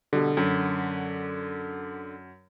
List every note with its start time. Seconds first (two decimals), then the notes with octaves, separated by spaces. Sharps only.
0.13 B2 D3 G3
0.37 F#2